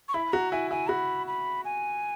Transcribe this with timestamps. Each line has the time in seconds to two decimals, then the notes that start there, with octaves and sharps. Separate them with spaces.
0.08 C#6
0.14 E4 B5
0.32 F#4 A#5
0.52 E4 G#5
0.71 E4 G#5
0.89 F#4 B5
1.27 B5
1.65 G#5